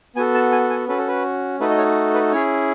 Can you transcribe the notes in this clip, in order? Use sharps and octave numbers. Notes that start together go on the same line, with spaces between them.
B3 F#4 A4 G#5
A5
G#5
G#5
C#4 F#4 A4 B4
A4
B4
A3 D#4 F#4 A4 B4
D#5
C#5
B4
C#4 E4 G#4 C#5